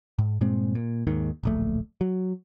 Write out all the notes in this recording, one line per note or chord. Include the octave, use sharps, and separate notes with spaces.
G#2
G2 A#2 G#3 C4
A#2
D#2 G#2 D#3
D1 A#1 A3
F#3